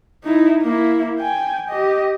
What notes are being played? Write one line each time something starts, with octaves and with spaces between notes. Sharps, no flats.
D#4 E4
A#3 E4
G5 G#5
G4 D#5